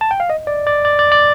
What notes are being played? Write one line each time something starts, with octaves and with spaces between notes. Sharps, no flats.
A5
G5
F5
D#5
D5
D5
D5
D5
D5